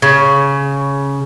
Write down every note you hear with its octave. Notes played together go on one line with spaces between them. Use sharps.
C#3